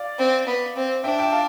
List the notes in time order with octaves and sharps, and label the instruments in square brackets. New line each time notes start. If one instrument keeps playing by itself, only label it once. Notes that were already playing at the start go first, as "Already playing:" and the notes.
Already playing: [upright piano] D5 F5
[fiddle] C4
B3
C4
[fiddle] D4 [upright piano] E5 G5
[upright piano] E5 G5
F5 A5